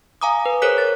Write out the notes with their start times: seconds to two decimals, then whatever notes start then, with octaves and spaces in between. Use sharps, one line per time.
0.21 F5 G#5 A#5 D6 D#6
0.46 B4
0.62 G#4 A#4 C5 C#5 F#6 B6
0.78 A6